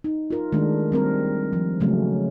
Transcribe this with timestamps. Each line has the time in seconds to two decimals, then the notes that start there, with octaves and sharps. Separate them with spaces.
0.04 D#4
0.31 F4 A#4
0.52 D#3 G#3 A3 D4
0.92 G3 C4 A#4
1.53 F3
1.80 C#3 F3 F#3 G#3 A3 C#4